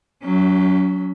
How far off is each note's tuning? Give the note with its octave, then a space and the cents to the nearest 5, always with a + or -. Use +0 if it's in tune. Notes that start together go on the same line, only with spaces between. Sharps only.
F#3 +0 C#4 +30